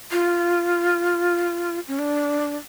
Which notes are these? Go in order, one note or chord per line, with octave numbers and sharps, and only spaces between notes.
F4
C#4
D4